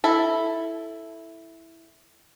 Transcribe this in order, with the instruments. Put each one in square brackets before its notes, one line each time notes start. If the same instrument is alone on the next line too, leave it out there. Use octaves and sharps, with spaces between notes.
[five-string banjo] E4 A4